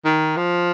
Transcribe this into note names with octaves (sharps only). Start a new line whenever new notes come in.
D#3
F3